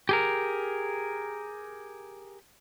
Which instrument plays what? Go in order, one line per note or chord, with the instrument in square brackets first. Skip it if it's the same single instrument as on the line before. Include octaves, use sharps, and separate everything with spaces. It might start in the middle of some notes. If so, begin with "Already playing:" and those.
[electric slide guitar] G4 G#4 A#4